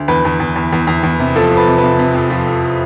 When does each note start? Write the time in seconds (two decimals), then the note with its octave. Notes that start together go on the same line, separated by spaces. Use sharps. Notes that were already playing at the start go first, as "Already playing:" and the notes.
Already playing: D2
0.08 E2 B4
0.25 E2
0.40 E2
0.56 E2
0.72 E2
0.87 E2
1.03 E2
1.19 C3
1.36 F3 A4
1.51 F2
1.57 B4
1.67 C3
1.78 B4
1.83 C3
1.99 C3
2.14 F2
2.30 F3
2.47 F2